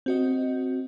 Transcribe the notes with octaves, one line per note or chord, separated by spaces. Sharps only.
C4 F#4 D#5